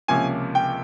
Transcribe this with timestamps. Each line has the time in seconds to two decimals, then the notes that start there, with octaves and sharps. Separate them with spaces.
0.08 C#2 C3 F3 A#3 C#4 G#5
0.55 G5